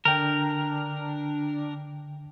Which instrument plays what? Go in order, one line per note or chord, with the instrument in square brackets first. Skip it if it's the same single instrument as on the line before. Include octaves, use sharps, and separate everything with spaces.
[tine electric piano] D3 G5 [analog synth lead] D4 [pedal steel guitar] A#4